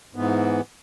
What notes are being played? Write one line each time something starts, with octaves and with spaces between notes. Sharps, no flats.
G#2 E3 B3